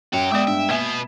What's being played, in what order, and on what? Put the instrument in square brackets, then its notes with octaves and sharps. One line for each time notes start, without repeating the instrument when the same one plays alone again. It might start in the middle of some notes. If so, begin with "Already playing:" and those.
[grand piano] F#2 [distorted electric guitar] F#4 C#5 [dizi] G5
[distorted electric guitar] G3 E5 [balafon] G#3 B3 D5 [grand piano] D6 D#6
[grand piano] G2 [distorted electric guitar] E5
[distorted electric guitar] B2 B3 [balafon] A#3 E5 G#5 [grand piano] G#6 B6 E7